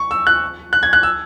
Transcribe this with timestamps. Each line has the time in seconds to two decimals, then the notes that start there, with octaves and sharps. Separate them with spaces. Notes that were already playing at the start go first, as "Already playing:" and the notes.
Already playing: C#6
0.11 E6
0.27 F#6
0.73 F#6
0.83 G#6
0.93 F#6
1.03 E6